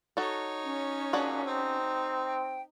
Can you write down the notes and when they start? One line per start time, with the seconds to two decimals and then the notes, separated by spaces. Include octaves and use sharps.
0.17 D#4 F#4 A4 C#5
0.64 C#4
1.13 A#2 D4 F#4 G#4
1.46 C4 D#4
2.26 G5